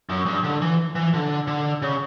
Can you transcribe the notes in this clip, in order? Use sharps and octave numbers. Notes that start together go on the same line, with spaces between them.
F#2
G2
D3
E3
E3
D3
D3
C#3